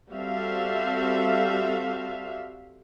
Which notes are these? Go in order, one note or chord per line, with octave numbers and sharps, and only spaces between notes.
G3 C4 F#4 A4 E5 F5